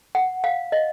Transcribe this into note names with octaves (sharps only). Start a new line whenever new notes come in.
F#5
F5
D#5